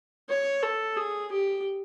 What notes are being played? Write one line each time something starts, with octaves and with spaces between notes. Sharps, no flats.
C#5
A4
G#4
G4